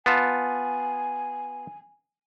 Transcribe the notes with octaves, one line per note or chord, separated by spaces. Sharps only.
B3 F4 G#5 A5